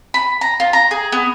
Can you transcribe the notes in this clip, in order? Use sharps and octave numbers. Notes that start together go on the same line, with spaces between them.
B5
A#5
F4
A#5
G#4
B3